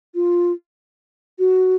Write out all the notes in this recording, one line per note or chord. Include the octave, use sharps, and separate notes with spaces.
F4
F#4